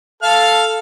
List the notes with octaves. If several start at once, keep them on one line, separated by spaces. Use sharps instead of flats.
A4 F5 F6